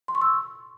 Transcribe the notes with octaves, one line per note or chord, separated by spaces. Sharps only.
C6
C#6
E6